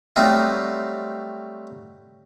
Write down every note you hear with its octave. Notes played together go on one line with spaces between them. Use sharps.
F#3 G3 A3 C4 D#4 F4